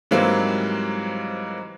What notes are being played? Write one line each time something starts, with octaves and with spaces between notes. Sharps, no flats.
G#2 E3 F#3 G3 A#3 C4